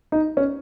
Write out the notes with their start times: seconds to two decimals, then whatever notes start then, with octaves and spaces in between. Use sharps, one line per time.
0.12 D#4
0.37 C#4